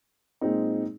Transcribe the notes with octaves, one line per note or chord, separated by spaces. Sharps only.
A#2 G#3 C4 D#4